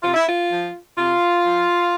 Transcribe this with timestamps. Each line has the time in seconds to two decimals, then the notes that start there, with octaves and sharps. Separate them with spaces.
0.02 C3 F4
0.14 E4
0.26 F4
0.50 F3
0.97 C3 F4
1.45 F3